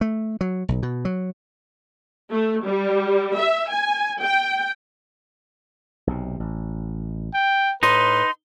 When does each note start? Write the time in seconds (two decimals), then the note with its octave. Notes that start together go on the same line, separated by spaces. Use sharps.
0.01 A3
0.41 F#3
0.69 B1
0.83 B2
1.05 F#3
2.30 A3
2.66 G3
3.38 E5
3.70 G#5
4.22 G5
6.07 B1 C3
6.40 A1
7.34 G5
7.83 A2 D#4 B4 C6